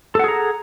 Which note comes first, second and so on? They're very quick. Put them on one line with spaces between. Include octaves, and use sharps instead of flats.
A4 F#5 G#4 A#5